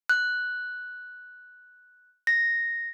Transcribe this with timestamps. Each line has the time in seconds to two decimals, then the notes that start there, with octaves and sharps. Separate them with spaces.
0.09 F#6
2.27 A#6